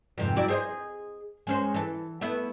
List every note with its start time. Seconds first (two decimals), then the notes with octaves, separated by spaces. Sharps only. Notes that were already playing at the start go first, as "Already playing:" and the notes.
0.18 F2 G#2 C3
0.36 F#3 E4 D5
0.48 G#4 C5 D#5
1.47 G#3 C#4 C5
1.74 E3 A4
2.21 A3 B3 E4